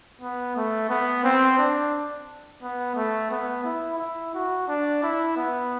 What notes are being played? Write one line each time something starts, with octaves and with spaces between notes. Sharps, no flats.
B3
A3
B3
C4
D4
B3
A3
B3
E4
E4
F#4
D4
E4
B3